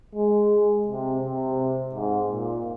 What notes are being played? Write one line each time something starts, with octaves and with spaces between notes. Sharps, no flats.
G#3
C3
C3
G#2
A#2